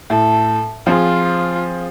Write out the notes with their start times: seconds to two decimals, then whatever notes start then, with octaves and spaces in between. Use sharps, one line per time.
0.10 A2 A4
0.87 F3 C4 F4 G#4